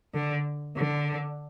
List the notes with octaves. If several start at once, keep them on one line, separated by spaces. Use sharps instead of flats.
D3
D3